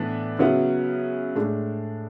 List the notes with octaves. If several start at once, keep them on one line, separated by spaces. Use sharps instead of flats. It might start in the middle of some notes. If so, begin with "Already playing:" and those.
Already playing: A2 E3 B3 D4
C#3 F#3 B3 E4
A2 G#3 D4